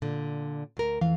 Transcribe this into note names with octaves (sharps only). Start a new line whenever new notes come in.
A#2 D3
D2 A#4
F2 E3 F5